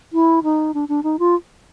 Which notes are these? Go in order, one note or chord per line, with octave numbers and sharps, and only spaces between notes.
E4
D#4
D4
D4
D#4
F4